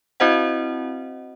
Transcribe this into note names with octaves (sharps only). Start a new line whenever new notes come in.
C4 E4 F#4 C5 D#5 F#5